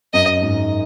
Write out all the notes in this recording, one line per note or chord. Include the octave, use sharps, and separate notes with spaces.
F#2 D#5
G#2